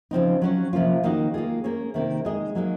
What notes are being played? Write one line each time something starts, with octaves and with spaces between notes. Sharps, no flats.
C#3 F3 C4 D#4
F#3 C#4 F#4 C#5
C3 F3 A#3 C#4 F4
D#3 A#3 D#4 F#4
A#3 F4 G#4
A#3 C#4 G#4 C#5
C3 D#3 A#3
G#3 D#4 G#4 D#5
F#3 A#3 D#4 G#4